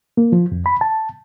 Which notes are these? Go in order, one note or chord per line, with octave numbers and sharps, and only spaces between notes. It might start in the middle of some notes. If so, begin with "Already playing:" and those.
A#3
F3
F2
B5
A5